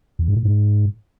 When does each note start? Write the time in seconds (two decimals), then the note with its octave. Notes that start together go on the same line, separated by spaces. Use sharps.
0.19 E2
0.28 G#2
0.36 A2
0.45 G#2